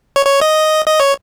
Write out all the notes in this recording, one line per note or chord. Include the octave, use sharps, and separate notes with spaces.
C#5
C#5
D#5
D#5
C#5